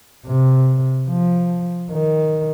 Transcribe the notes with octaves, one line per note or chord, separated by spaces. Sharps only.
C3
F3
D#3